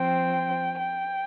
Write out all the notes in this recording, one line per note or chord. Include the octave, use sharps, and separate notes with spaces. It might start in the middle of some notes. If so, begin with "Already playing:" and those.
Already playing: F3 C4 G5
G5